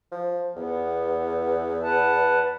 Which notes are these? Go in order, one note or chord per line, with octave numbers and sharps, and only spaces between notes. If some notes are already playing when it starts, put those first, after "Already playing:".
F3
E2 B3
B4 F#5 A5